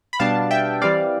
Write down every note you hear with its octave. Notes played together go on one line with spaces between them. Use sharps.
B5
B2 G3 B3 D4 F5 A5
E5 G5
E3 G3 C4 D5 F5